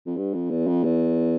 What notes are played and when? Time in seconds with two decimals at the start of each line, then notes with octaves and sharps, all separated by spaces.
0.06 F2
0.17 G2
0.34 F2
0.50 E2
0.67 F2
0.83 E2